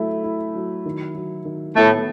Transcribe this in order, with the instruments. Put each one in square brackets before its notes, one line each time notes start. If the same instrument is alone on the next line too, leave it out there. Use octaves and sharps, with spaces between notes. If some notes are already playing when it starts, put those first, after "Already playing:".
Already playing: [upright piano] F#3 A3 E4
E4
F#3
D#3
F#3
D#3
[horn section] A2 A3 [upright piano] B3